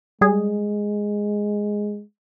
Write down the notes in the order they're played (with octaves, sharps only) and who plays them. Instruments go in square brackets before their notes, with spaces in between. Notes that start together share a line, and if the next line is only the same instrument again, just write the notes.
[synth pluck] G3 G#4 [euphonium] G#3